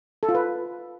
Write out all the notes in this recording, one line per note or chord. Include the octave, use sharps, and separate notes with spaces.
A4
F4
B4